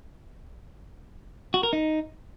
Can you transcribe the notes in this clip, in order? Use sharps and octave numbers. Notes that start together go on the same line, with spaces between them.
F#4
A#4
D#4